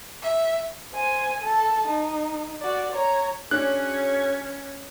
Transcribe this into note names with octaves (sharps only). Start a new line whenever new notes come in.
E5
C5 G#5
A4 A5
D#4
F#4 D5
C#5 A#5
C#4 D4 F#4 G#4 C#5 F#6